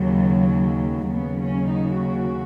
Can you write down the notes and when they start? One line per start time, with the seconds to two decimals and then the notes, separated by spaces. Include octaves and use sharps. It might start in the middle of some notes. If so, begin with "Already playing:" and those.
Already playing: D#2 C#3 F#3
1.11 D#2 C#3 F#3 B3
1.39 C#4
1.67 D#4
1.96 F#4